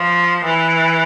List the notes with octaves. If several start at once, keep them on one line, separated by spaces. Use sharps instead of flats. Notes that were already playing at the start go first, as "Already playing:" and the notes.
Already playing: F3
E3